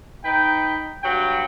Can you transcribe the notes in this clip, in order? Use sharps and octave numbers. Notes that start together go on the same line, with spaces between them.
D#4 B4 G5
G2 F#3 F#4 G5